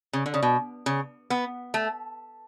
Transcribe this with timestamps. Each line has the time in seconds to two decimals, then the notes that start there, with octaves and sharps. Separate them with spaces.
0.13 C#3
0.26 D3
0.34 C#3
0.43 B2
0.86 C#3
1.30 B3
1.74 A3